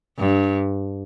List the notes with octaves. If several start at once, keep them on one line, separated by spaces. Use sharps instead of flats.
G2